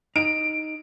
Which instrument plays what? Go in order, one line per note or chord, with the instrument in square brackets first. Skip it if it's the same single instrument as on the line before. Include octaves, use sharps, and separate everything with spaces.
[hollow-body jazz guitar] D#4 [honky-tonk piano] D7